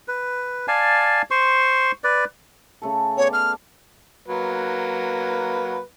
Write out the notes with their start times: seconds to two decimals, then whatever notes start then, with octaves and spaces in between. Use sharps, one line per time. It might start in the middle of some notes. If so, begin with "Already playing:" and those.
0.08 B4
0.68 D5 F5 G#5 A5
1.31 C5 C6 C#6
2.04 B4 D5
2.82 C#3 A3 A4
3.18 B3 C#5 D5
3.33 F6
4.28 F#3 A#3 B4